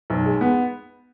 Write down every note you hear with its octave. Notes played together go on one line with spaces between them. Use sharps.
B1
G#3
B3